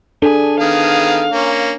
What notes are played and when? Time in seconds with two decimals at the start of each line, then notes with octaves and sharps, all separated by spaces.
0.22 D4 G#4 A4
0.60 D#3 B3 G#4 F5
1.32 A#3 C#4